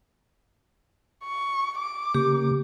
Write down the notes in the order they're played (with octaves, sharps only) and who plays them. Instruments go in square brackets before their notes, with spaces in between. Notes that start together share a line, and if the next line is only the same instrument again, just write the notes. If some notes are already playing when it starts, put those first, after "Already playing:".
[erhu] C#6
D6
[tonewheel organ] C#3 A#3 [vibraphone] G4